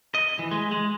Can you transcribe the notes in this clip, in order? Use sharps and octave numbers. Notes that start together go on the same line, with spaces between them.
D#5
E3
G#3
G#3